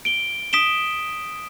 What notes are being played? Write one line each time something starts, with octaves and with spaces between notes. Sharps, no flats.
D7 G7
D#6 B6 D7 E7 G7